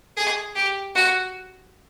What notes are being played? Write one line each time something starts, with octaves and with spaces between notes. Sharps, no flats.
G#4
G4
F#4